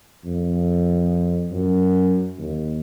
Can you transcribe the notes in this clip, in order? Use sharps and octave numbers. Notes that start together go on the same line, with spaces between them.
F2
F#2
D#2